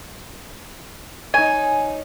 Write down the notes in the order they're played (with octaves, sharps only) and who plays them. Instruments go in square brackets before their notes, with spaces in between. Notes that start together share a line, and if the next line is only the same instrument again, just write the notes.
[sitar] D#4 C#5 [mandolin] G#5